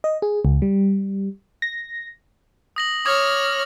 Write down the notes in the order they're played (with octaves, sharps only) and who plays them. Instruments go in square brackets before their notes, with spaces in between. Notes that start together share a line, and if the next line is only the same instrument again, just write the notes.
[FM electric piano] D#5
G#4
C#2
G3
A#6
[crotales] D#6 A#6 F#7
[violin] C#5 F6 [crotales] D6 D#6 G#6